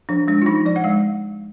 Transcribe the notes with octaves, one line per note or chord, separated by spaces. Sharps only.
F3 D4
G#3 D4
F4
F3 D#4
F3 D5
F#5
G#3 F5